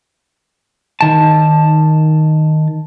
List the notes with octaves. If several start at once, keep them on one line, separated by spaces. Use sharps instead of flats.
D#3 A5